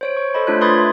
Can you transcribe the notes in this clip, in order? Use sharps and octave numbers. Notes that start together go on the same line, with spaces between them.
C5 C#5 D7
C#6
A4 C5 D#5 B5
A3 D4 F4 C#5 F#6
B4 B5 C6 D#6 G#6 A6
E5